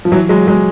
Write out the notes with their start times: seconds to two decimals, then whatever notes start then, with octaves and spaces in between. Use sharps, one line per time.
0.05 F3
0.12 E3 F#3
0.29 F#3 G#3
0.47 F#3 G#3